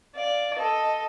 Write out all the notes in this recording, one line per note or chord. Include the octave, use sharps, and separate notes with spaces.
D5 F5
A4 D#5